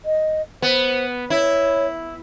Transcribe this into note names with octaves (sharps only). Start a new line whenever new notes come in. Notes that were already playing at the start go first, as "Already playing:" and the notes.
D#5
B3 C5
E4 C#5